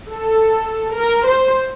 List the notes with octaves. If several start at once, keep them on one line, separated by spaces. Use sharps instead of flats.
A4
A#4
C5